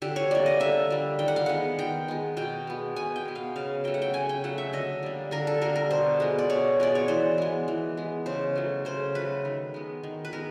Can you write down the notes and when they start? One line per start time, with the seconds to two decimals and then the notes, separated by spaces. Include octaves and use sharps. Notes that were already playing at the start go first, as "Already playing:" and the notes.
0.02 D3 G4
0.16 C#5
0.31 G3 A#3 D5
0.46 D#5
0.60 D3 E5
0.90 G3 A#3
1.19 D#3 G5
1.28 F#5
1.36 F5
1.46 G#3 B3 F#5
1.79 D#3 G5
2.08 G#3 B3
2.37 B2 G5
2.67 G#3 B3
2.96 B2 G#5
3.16 G5
3.25 G#3 B3
3.35 F5
3.56 C#3 F5
3.84 F#3 A3 G5
3.94 F#5
4.02 G5
4.13 C#3 G#5
4.29 G5
4.44 F#3 A3 F#5
4.58 E5
4.73 D3 D#5
5.03 G3 A#3
5.31 D3 A#4
5.47 A4
5.62 G3 A#3 A#4
5.76 A#4
5.90 B2 C5
6.20 G#3 B3
6.39 D5
6.50 B2 C#5
6.80 G#3 B3 D5
6.95 C#5
7.08 E3 C5
7.38 G#3 B3
7.68 E3
7.97 G#3 B3
8.26 C#3 C5
8.56 F#3 A3
8.85 C#3 C5
9.15 F#3 A3 B4
9.45 D#3
9.74 G#3 B3
10.03 D#3
10.25 B4
10.33 G#3 B3 A#4